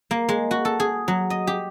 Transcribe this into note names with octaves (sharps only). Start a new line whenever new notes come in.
A#3
G#3
F#4
A4
G#4
F#3
D#5
G4